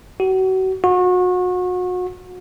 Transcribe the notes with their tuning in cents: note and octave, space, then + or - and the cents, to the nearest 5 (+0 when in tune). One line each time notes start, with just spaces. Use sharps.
F#4 +30
F#4 -35